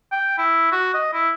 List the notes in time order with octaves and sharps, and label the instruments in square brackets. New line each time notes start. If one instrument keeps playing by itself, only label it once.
[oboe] G5
E4
F#4
D#5
E4